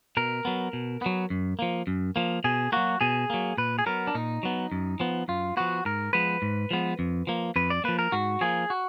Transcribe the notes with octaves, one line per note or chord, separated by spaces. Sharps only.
B2 A#4
F#3 B3
B2
F#3 B3
F#2
F3 A#3
F#2
F3 A#3
B2 G#4
F#3 A#3 F#4
B2 G#4
F#3 A#3
A#2 B4
G#4
F#3 B3 A#4
D4
A#2 D#4
F#3 B3
F#2
F3 B3
F#2 F4
F3 B3 F#4
G#2 A#4
F3 G#3 B3 B4
G#2
F3 G#3 B3
F2
F3 A#3
F2 B4
D5
F3 A#3 B4
A#4
G#2 F#4
F3 A#3 G#4
F#4